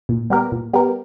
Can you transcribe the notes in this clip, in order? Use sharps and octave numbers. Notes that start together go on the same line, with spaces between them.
A#2
G3 B3 G4 A#4
A#2
G3 B3 G4 A#4